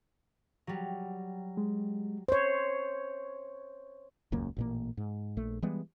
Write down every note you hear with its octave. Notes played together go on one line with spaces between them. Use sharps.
F#3 G3
G#3
C5 C#5
D#1 C#2 F#2 A#3
A1 A#2 A#3
G#2
A#1 A3
E3 G3 G#3 B3